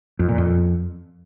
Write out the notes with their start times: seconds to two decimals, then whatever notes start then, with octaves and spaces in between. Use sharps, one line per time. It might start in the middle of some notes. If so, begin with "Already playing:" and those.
0.19 F2
0.29 A#2
0.38 F2